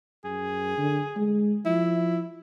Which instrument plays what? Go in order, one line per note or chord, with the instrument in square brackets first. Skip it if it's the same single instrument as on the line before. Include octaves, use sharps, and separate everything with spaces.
[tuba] F#2 [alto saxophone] G#4
[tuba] D3
G#3
[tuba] F3 [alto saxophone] E4